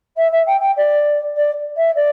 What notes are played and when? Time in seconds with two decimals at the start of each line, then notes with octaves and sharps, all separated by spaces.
0.17 E5
0.32 E5
0.47 G5
0.60 G5
0.77 D5
1.36 D5
1.76 E5
1.95 D5